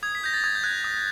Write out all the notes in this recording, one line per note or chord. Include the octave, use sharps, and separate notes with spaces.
D#6 G#6
B6
G6 A#6
A6
D#6 G#6
G6
F#6 G#6
D#6